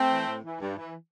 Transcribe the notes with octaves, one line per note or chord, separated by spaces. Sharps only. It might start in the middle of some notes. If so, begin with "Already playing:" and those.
Already playing: A3 C4
E3
A2
E3
G2
E3